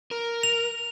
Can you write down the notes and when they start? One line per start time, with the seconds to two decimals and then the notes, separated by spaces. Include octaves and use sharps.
0.11 A#4
0.43 F7